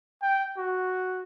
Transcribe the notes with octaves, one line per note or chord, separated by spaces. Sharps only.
G5
F#4